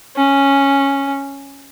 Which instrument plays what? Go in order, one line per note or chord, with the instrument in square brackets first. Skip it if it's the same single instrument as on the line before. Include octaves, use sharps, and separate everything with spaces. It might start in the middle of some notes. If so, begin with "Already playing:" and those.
[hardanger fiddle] C#4